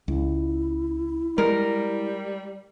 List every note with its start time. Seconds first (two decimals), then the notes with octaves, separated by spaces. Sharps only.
0.08 C#2 E4
1.38 G3 G#3 A#4